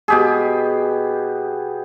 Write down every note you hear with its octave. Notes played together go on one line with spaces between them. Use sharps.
B2 G4 G#4